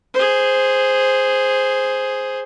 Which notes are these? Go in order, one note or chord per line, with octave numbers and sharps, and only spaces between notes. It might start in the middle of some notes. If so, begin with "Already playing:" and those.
G#4 C5